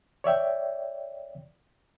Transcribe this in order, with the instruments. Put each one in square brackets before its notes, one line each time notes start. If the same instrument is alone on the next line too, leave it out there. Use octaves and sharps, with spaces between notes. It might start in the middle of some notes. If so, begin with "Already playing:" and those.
[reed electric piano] C#5 D5 E5 G5